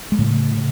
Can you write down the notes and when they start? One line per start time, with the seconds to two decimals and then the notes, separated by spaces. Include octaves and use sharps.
0.12 G#3
0.19 A2 C#3 A3
0.55 C#3